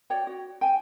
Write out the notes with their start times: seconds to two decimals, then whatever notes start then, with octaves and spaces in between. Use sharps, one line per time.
0.10 F#4 C#5 D5 G5
0.27 F#4
0.61 G5 G#5